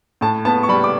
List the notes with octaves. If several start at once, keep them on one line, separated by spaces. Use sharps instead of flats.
A2 A5
B3 A5
C#6
G3 B5
D6